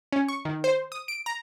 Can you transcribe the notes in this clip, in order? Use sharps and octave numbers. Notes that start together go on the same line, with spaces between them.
C#4
C#6
D#3
C5
D#6
D7
A#5